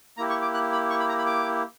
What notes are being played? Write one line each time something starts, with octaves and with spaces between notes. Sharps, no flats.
A#3 E4 G4 A#5
C#6
D6
F#6
B5
C#6
B5
A#5
B5
D6